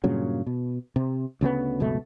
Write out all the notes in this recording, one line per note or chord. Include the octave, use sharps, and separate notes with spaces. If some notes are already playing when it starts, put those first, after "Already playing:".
G2 A#2 C#3 F#3
B2
C3
D2 C#3 F#3 B3
F#1 C#2 B2 A3